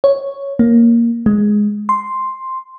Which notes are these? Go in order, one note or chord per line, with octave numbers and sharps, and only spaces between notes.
C#5
A#3
G#3
C6